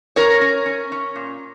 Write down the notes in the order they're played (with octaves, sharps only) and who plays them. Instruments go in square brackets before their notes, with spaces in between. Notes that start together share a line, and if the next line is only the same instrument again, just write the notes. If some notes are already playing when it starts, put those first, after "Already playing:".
[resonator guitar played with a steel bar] C#4 A#4 C#5
C#4
C#4
C#4
A#2